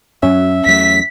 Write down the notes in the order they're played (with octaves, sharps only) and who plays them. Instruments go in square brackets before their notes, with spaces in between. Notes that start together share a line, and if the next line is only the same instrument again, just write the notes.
[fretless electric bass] F#2 F#3 [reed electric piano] C#4 [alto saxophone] E5
[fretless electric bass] E2 F#3 A3 [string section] B6